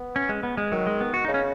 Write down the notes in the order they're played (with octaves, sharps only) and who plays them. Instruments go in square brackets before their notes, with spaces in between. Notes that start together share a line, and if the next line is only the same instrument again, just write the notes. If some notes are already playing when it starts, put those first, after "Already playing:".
Already playing: [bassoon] B3
[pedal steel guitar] C#4
G#3
B3
G#3
[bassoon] D#3 [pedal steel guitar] F#3
[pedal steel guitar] G#3
B3
F#4
[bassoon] C#3 [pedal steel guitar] D#4
[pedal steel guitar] C#4